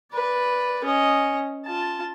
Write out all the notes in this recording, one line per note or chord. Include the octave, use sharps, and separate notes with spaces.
B4 D5
C#4 D#5
F4 A5